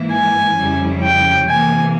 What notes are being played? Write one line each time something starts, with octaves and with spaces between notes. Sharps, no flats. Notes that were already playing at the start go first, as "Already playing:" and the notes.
Already playing: G#2 E3 A#3 E4
G#5
F2 C#3 G3 C#4 E4
G5
C3 E3 A#3 G#5